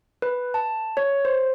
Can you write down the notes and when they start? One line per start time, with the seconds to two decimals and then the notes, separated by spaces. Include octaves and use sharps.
0.22 B4
0.54 A5
0.97 C#5
1.25 C5